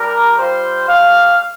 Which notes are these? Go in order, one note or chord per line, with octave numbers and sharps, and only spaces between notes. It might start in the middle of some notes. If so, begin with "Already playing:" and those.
Already playing: G3 D4 G4 A#4
G3 C4 F4 C5
A3 D4 G4 F5